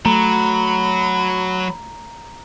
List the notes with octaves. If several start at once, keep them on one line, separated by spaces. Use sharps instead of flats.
F#3 A3 A#5 B5